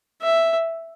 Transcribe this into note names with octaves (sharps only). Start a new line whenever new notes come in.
E5